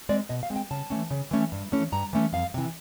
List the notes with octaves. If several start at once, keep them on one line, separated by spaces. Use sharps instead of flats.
G#3 C4 D5
B2 D#5
F5
G#3 C4
G5
C#3 A5
E3 A3 C#4
C#3
E3 A3 C#4
G2
E3 A3 C#4
G2 A#5
E3 A3 C#4
F2 F5
C3 E3